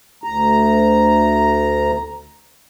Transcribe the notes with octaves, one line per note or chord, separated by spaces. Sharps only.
D2 A#5